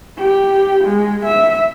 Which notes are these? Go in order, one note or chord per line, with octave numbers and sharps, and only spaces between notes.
G4
G#3
E5